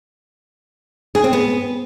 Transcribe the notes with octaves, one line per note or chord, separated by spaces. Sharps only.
G#4
C4
B3